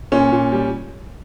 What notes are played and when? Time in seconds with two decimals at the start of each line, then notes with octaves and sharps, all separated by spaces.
0.12 A#2 C#4
0.32 A#2
0.52 G3